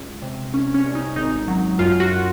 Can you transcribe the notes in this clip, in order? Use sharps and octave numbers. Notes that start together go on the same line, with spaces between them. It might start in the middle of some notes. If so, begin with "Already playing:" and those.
Already playing: C#2
C3
C2 C#4
C#4
C2
D#4
G#1 D#4
F#3
F#2 F4
F#4